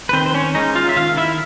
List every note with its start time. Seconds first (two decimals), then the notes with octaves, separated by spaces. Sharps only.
0.09 B4
0.13 D#3 C4 C5
0.26 C5
0.34 C#4 C#5
0.55 G#3 C#4 D#4 D#5
0.75 F4 F5
0.89 E5
0.96 D#3 F4 F5
1.17 E4 E5